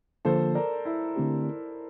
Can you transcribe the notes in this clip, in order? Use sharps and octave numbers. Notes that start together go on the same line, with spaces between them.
D3 F3 A#3 F4 A4 C5
A#4 D5
E4
D3 A3 C4 G4